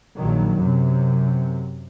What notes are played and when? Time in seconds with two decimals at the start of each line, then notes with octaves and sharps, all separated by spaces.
0.16 A#1 D#3 F#3
0.58 F#2 C3